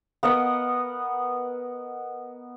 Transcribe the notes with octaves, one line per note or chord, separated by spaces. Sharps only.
B3 A#4 D#5 F#5